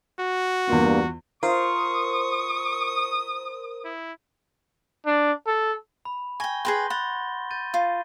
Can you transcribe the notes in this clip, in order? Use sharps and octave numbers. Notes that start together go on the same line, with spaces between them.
F#4
E2 G2 A#3 F4
F4 A#4 C5 C#6 D#6
E4
D4
A4
B5
G5 G#5 C#6 A#6 G7
G#4 B4 G5 C6 G6 A#6
F#5 B5 A6 G7
G6 A6 D#7
F4